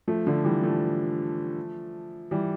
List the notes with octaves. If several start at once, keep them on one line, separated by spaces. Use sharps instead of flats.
F3 A3
D3 F3
E3 G3
F3 A3
E3 G3